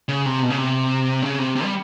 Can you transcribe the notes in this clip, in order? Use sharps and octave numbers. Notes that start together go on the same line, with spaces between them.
C#3
C3
B2
C#3
C3
C#3
C3
C3
G3